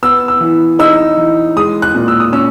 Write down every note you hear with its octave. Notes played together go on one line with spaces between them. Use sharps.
B3 E6
E6
E3
D#4 E6
E3
G#3 D#6
F#6
A#2
E6
D#6
C#4 E6